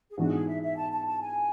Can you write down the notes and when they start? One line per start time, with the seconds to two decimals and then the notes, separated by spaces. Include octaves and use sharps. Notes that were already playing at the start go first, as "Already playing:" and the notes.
0.10 G#4
0.18 G#2 E3 B3 D4 F#4
0.33 G#4
0.47 E5
0.62 E5
0.77 A5
0.91 A5
1.06 A5
1.20 G#5